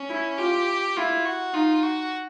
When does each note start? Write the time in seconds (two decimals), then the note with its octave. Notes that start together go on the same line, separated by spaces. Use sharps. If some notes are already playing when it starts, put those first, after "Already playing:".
Already playing: C#4
0.09 E4
0.38 F4 G4
0.97 E4 F4
1.25 F#4
1.54 D#4 F4
1.83 F#4